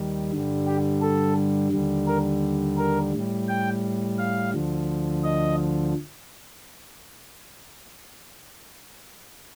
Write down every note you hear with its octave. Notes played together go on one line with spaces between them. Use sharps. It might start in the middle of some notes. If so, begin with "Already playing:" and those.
Already playing: D#2 D#3 G3
G2 D3 G3
G4
A4
D#2 D3 G3
A#4
A#4
A2 G3
G5
F5
D2 D3 F3
D#5